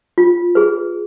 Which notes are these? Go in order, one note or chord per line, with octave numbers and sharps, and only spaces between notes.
F4
G#4 B4